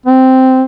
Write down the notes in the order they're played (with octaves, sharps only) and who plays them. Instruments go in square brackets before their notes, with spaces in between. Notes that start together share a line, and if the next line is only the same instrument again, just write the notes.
[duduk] C4